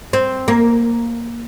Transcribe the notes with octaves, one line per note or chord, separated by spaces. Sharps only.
C4
A#3